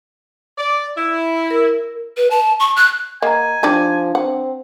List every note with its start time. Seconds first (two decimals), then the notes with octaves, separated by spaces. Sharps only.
0.57 D5
0.97 E4
1.51 A#4
2.17 B4
2.31 A5
2.60 C#6
2.76 F#6
3.22 A#3 D#5 F#5 G#5 A#5
3.63 F3 D4 D#4 G4 D5 A5
4.15 C4 F#5